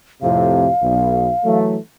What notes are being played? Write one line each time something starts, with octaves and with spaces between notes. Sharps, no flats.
F2 A2 C3 F5
B1
E3 F#3 A3